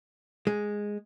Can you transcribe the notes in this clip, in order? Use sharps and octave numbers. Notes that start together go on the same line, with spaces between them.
G#3